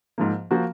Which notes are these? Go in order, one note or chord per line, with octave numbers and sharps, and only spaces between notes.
G#2 F3 A#3
F3 A#3 F#4